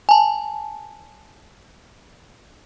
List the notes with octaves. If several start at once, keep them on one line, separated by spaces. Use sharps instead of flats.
G#5 A5